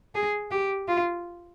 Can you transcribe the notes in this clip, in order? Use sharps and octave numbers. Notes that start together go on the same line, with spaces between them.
G#4
G4
F4